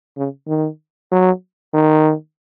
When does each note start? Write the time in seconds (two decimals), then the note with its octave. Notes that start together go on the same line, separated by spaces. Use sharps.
0.17 C#3
0.48 D#3
1.12 F#3
1.74 D#3